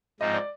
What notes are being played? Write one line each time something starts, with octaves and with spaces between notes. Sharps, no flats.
G#2 F3 C4 D#4 D#5
D5